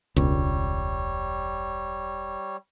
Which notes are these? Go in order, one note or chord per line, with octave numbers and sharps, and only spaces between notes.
E1 C#2 G3 C#5